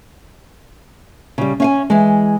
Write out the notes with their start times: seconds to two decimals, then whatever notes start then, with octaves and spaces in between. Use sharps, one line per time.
1.38 C#3 G3
1.60 C#4 F5 G#5
1.90 E3 G#3